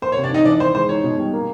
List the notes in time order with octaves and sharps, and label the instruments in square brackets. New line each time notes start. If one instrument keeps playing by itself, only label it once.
[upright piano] A#3 [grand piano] C5
[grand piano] C#5
[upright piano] C3
[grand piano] D4 D5
[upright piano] D#3 [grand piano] D#4 D#5
[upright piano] E3 [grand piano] D4 D5
[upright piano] E3 [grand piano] C5
[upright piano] G#3 [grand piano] C5
[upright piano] D#4 [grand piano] C#5
[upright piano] B2
G3
A#3